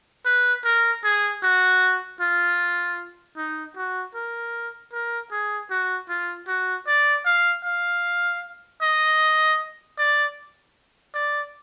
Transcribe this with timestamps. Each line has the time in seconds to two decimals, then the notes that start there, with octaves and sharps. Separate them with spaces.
0.26 B4
0.65 A#4
1.04 G#4
1.43 F#4
2.21 F4
3.37 D#4
3.77 F#4
4.15 A#4
4.93 A#4
5.32 G#4
5.71 F#4
6.09 F4
6.48 F#4
6.87 D5
7.26 F5
7.65 F5
8.82 D#5
9.98 D5
11.14 D5